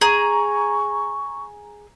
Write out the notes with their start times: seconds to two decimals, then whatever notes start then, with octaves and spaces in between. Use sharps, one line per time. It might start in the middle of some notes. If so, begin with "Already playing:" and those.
0.01 G#4 A#5 C#6